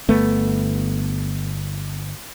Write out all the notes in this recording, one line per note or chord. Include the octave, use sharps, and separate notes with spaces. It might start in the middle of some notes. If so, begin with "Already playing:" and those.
G1 A3 B3